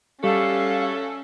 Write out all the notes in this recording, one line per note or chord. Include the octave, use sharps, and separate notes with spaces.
G3 A3 C#4 F#4 A4 F5